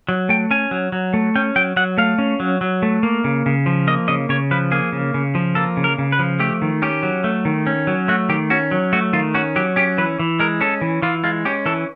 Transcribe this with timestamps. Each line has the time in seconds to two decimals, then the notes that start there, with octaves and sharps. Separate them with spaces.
0.09 F#3
0.29 A3 G5
0.51 C#4 G#5
0.71 F#3
0.92 F#3
1.14 A3
1.35 C#4 G5
1.56 F#3 G5
1.77 F#3 F#5
1.98 A3 F5
2.18 C#4
2.40 F#3
2.61 F#3
2.83 A3
3.03 A#3
3.24 C#3
3.46 C#3
3.66 F3
3.87 A#3 D#5
4.08 C#3 D#5
4.29 C#3 C#5
4.51 F3 B4
4.72 A#3 G#4
4.92 C#3
5.14 C#3
5.35 F3
5.55 A#3 A4
5.77 C#3
5.84 A#4
5.99 C#3
6.12 B4
6.19 F3
6.40 A3 G4
6.62 D#3
6.82 C#4 G4
7.03 F#3
7.24 A3
7.45 D#3
7.67 C#4
7.87 F#3
8.08 A3 F#4
8.29 D#3 G4
8.50 C#4 F#4
8.71 F#3
8.93 A3 F#4
9.13 D#3 F4
9.35 C#4 F#4
9.56 F#3 G4
9.76 C#4 G4
9.98 E3 B4
10.19 E3
10.39 G#3 A#4
10.61 C#4 A4
10.81 E3
11.02 E3 F4
11.24 G#3 F4
11.45 C#4 G4
11.66 E3 A4